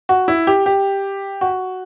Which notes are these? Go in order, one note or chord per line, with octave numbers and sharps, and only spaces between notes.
F#4
E4
G4
G4
F#4